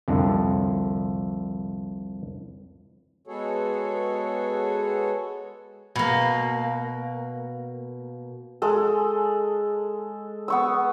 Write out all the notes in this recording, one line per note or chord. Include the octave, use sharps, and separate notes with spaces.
C2 F2 D3
G#3 B3 F#4 G#4 A4 C#5
B2 A#3
G#3 A4
B3 C#6 E6